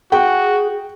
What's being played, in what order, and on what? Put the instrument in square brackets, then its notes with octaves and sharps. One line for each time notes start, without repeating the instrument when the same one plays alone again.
[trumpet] F#4 [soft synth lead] G#4 [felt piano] G5